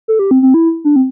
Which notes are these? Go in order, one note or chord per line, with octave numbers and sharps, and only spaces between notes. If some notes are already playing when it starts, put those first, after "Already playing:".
A4
G4
C4
C4
E4
D4
C4